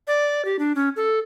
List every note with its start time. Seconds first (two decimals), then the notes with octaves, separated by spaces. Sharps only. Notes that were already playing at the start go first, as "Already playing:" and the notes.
0.07 D5
0.45 G4
0.59 D4
0.75 C#4
0.96 A4